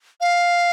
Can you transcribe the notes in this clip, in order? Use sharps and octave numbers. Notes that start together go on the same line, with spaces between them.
F5